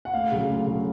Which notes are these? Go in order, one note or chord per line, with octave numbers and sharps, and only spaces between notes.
F#5
D2 F5
C#3 F#3
D2
C#3 F#3